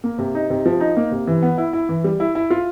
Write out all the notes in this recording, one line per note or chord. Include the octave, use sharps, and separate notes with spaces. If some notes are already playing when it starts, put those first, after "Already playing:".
A#3
C3
D#4
C3
F3
D#4
A#3
C3
E3
B3
E4
E4
E3
G3
E4
E4
F4